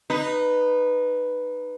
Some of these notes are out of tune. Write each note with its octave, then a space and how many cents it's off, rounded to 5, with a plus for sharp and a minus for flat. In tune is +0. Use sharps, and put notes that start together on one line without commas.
D#4 -20 B4 +0